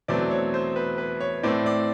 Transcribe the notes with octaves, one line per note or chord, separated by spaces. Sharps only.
E2 B2 F#3 A3 C4 D5
C#5
C5
B4
B4
C#5
A2 E3 A3 C4 D5
D5